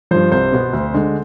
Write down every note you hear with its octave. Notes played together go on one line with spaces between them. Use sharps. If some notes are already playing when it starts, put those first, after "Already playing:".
G2 F3 C5
C2 C5
B2 B3
D2
D3 G#3